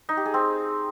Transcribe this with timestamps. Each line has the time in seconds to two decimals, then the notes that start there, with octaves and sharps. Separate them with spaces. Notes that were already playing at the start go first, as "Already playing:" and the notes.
0.09 D#4
0.17 G4
0.26 G#4
0.34 C4